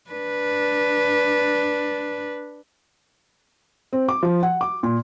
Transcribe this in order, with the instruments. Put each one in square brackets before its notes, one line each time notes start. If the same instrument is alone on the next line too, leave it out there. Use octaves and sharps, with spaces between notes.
[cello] D4 B4
[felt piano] C4
D6
F3
F#5
D6
A#2